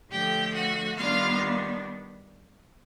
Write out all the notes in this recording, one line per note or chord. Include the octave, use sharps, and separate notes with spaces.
D3 F3 A3 G4 G5
F#4 F#5
D#3 G3 B3 D4 F4 F5